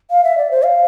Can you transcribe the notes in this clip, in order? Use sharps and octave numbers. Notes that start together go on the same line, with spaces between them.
F5
E5
D5
C5
F5